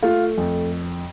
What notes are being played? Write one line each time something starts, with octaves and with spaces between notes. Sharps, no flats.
A3 F4
F2